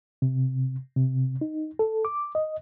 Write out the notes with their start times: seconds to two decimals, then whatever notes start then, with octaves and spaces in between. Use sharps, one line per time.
0.22 C3
0.96 C3
1.41 D#4
1.79 A4
2.05 D6
2.35 D#5